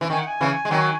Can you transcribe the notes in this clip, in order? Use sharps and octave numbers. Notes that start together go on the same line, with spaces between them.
E3
D#3 G#5
F#5
G#5
C#3 E3
G#3
D#3 F#3